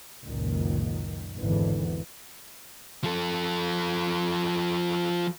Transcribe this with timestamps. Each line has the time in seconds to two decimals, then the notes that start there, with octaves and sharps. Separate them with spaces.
0.25 F#1 C#2 A#2 D#3
1.40 G#1 E2 G#2 D3 E3
3.04 F3 A4